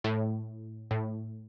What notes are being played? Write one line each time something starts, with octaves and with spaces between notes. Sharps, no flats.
A2
A2